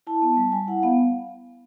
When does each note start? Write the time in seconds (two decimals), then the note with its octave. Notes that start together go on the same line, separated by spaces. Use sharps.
0.07 E4 A5
0.22 B3 A5
0.37 G3 A5
0.52 G3 G#5
0.68 E4 F#5
0.83 B3 F5